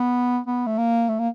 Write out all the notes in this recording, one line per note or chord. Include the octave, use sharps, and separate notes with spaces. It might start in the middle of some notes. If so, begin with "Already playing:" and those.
Already playing: B3
B3
A3
A#3
A3
A#3